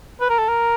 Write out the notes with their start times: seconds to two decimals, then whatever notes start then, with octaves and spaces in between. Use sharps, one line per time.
0.21 B4
0.29 A#4
0.38 A4
0.48 A#4